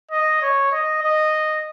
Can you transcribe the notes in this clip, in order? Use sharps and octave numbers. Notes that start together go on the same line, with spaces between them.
D#5
C#5
D#5
D#5